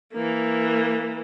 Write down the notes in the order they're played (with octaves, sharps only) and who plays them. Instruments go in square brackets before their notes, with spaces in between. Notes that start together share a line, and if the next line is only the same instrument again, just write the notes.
[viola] E3 A#3